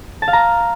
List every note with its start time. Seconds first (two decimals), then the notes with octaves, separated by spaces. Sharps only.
0.22 A5
0.28 F5
0.33 A#5